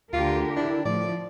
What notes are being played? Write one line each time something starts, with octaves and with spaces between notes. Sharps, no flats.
D2 D3 F4 G4 A#4
D4 E4
A2 F3 D5